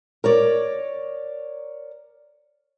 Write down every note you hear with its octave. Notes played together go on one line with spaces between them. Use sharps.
A#4 C#5 D5